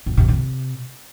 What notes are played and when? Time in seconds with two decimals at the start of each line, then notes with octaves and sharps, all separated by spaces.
0.06 C#3
0.17 C3
0.28 C3